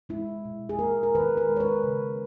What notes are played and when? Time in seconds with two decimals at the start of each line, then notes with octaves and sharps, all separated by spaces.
0.09 G#3 E4
0.45 B2
0.69 G#4
0.79 A#3 A#4
1.03 A#4
1.15 D#3 B4
1.37 A#4
1.49 G#3
1.56 C#5
1.60 B4
1.84 C#3